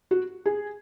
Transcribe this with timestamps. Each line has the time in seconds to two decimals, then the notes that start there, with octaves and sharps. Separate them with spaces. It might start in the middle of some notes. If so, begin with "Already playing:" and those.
0.11 F#4
0.46 G#4